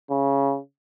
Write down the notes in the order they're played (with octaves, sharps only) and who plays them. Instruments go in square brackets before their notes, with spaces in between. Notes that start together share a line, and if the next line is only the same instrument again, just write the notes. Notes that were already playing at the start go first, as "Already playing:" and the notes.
[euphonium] C#3